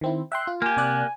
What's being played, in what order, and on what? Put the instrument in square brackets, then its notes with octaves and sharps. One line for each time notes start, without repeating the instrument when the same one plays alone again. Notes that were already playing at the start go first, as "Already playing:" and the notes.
[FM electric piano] D#3 C4 E4
[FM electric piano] E5 G5 C6 [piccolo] F#6
[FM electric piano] F4
[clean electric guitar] A#3 G4 [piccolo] G#5
[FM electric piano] C3 D5 F#6